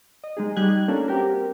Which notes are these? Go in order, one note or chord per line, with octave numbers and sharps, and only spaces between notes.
D#5
G#3 D#4 G#4
G3 D#4 G4 F#6 G#6
A#3 C#4 D4 F4 A4 A#4
C4 F#4 G4 A#4